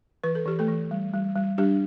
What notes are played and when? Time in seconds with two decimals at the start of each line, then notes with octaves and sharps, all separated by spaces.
0.24 E3 B4
0.35 A4
0.46 E3 G4
0.59 A3 A4
0.68 E3
0.91 G3
1.13 G3
1.36 G3
1.58 G3 D4 G4